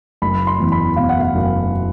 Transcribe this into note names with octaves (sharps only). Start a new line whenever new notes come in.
F#1 B5
C6
E2
B5
B2 F5
F#5
F5
F#1